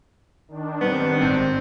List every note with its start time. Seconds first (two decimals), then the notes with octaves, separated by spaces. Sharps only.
0.48 D#3 D4
0.81 G3 B3 C4
1.21 G#1 G#2 C4